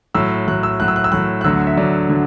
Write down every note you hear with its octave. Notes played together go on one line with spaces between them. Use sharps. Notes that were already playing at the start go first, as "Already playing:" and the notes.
A2 F#3 E6
A2 F#3 F#6
E6
A2 F#3 F#6
E6
F#6
E6
A2 F#3 F#6
F#6
D2 D3 F#3 E6
E5
D2 D3 F#3 D5
D3 F#3